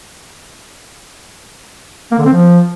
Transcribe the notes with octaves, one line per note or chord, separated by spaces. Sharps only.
A#3
D3
C4
F3